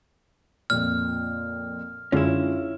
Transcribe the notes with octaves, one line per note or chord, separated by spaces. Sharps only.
F2 A#2 F6
F#2 D3 G#3 C#4 E4 F4